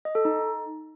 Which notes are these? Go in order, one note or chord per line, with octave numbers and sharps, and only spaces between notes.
D#5
A4
D#4